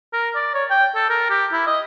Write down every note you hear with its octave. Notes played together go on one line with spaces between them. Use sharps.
A#4
D5
C#5
G5
A4
A#4
G4
E4
D#5